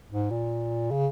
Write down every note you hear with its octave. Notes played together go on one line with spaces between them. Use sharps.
G#2
A#2
C#3